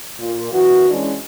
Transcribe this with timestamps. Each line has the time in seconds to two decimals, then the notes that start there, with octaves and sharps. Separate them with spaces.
0.19 A#2
0.53 F#2 E3 F#4
0.90 E3 G#3 C#4 D4